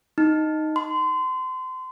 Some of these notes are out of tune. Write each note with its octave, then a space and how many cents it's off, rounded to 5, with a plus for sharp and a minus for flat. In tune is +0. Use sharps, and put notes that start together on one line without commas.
D#4 +0
C6 -30